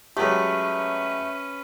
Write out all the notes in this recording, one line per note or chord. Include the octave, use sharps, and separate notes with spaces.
F#3 G#3 A3 C#4 G4 B4